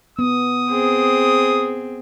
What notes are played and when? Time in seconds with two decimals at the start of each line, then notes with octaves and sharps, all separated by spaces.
0.19 B3 D#6
0.70 C4 G#4